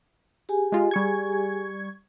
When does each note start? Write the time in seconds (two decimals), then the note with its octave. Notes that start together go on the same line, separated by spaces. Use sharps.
0.49 G4 G#4 G#5
0.72 G#3 F4
0.91 G3 C#6 G#6